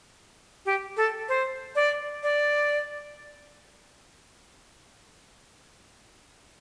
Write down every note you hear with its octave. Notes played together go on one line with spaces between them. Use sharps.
G4
A4
C5
D5
D5